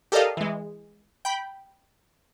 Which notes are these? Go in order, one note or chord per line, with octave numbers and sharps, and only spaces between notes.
G4 A4 A#4 D5 D#5 F5
E3 G#3
G5 B5